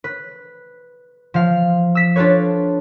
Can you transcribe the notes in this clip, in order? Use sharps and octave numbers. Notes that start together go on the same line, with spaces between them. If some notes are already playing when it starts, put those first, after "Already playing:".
B4
F3 F5
E6 B6
D4 F4 A4 B4 C#5